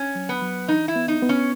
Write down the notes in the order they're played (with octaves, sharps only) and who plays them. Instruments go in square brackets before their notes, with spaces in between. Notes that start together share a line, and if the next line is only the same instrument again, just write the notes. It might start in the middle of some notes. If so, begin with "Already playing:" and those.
Already playing: [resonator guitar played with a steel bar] C#4
[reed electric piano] F#3
[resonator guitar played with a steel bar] B3
[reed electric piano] F#3
[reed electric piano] E3 [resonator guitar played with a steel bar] D#4
[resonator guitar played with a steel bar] E4
[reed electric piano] B3
[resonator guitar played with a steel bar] D#4
[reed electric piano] B3
[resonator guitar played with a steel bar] C#4